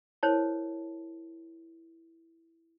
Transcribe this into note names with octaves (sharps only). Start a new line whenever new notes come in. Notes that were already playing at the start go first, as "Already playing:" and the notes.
E4 A#4 C5 C#5 A5